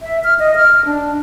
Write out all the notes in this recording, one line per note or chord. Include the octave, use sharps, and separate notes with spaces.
E5
F6
D#5
F6
D4